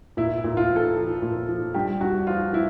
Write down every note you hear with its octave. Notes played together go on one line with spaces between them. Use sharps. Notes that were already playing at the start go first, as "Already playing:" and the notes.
A#2 E4
E4
A#2
F4
F3
A4
F3
A#2
F3
G2 G4
G2 F#4
F3 F4
F3 E4